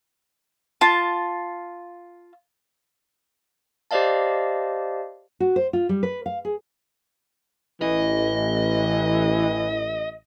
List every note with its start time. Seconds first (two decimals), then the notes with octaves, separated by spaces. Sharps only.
0.81 F4 A5
3.91 G4 C5 D5 D#5 F5 A5
5.40 F#4
5.56 C5
5.73 F4
5.89 G3
6.03 B4
6.26 F5
6.45 G#4
7.82 A1 E3 D#5